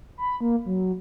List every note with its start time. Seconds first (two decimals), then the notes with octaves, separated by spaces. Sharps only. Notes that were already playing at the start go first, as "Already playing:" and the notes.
0.18 B5
0.41 A#3
0.66 F#3